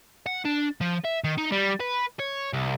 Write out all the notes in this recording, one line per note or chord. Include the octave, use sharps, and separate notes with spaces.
F#5
D4
F3
E5
D#3
D#4
G3
B4
C#5
C2